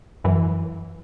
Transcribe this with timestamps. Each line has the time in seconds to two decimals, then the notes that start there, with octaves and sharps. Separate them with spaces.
0.24 F#2 E3